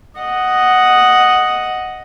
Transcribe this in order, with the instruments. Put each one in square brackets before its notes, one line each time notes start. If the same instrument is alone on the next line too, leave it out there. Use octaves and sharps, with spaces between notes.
[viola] D#5 F#5